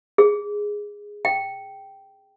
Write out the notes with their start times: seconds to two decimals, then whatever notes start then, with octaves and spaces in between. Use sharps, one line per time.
0.18 G#4
1.25 G5